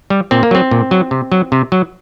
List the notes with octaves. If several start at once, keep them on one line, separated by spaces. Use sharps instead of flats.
G3
A#2 C4
A#3
F#3 C4
A#2
F#3
C3
F#3
C3
F#3